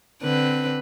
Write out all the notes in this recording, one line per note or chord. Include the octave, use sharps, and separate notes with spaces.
D3 C4 B4